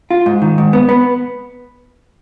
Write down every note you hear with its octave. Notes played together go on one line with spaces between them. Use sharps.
F4
G#2
D#3
G#2
B3
B3